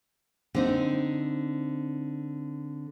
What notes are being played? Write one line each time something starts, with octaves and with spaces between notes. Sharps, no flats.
D3 C4 D#4